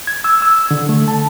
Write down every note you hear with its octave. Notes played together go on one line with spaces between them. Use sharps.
G#6
E6
E6
D3
A3
A5